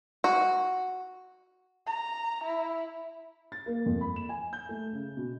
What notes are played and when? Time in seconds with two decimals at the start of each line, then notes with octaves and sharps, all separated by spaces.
0.24 F#4
1.87 A#5
2.45 E4
3.52 A6
3.66 A#3
3.86 F2
4.01 B5
4.16 E7
4.29 G#5
4.53 G6
4.69 A3
4.93 C#3
5.17 B2